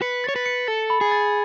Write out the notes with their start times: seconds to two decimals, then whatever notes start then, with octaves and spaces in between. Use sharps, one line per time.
0.02 B4 C#7
0.24 C#5 A6
0.36 B4
0.46 C#7
0.67 A4 A6
0.90 B5
1.01 G#4
1.12 A6